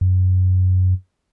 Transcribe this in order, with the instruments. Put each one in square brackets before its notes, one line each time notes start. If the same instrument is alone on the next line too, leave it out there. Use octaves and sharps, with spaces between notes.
[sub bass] F#2